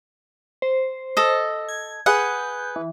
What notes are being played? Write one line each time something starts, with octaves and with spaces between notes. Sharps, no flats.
C5
A4 D#5
G#6
G#4 B4 F#5 G6
E3